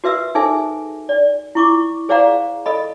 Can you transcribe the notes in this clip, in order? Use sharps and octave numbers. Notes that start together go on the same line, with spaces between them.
F#4 B4 E5 E6
D#4 G#4 A4 C5 E5 G#5
D5
E4 C#6 D6
G#4 C5 D5 F5 F#5 A#5
A4 D#5 B5